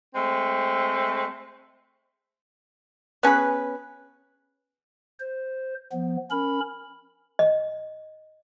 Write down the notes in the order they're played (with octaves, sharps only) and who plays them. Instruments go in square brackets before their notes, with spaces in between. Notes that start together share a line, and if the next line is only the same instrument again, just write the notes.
[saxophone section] G#3 A3 C4
[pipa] B3 C#4 G#4 B4
[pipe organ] C5
F3 B3
C#4 A#4 B5
[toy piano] D#5